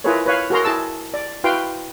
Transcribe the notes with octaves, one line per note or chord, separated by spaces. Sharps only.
E4 F4 G#4 A#4 B4 C#5
B4 C#5 F5
F#4 G#4 A#4 A#5 C6
E4 G#4 A5 E6
D5
E4 F#4 B4 F5 G5 C6